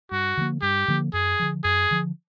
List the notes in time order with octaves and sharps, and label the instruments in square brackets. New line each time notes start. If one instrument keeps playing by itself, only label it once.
[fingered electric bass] G2 [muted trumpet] F#4
[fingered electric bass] D3 F3 A#3
[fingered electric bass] G2 [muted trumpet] G4
[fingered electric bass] D3 F3 A#3
[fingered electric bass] F#2 [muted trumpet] G#4
[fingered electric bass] D3 F3
[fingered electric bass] F#2 [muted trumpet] G#4
[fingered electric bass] D3 F3